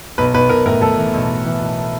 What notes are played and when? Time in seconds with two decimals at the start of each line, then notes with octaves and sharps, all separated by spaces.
0.18 B1 B4
0.34 B1 B4
0.49 B1 A#4
0.66 A2 A#4
0.82 A2 A4
0.98 E3
1.13 B1
1.29 B1
1.46 E3
1.61 B1